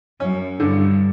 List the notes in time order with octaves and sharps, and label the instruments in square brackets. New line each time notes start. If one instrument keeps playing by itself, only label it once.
[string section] F#2 [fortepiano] C#4
[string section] G2 [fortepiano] D3